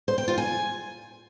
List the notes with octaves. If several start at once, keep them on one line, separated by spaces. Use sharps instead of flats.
C5
G5
F4
G#5